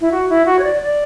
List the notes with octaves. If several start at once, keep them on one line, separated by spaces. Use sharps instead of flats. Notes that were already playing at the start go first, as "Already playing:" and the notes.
E4
F#4
E4
F#4
C#5
D5
D5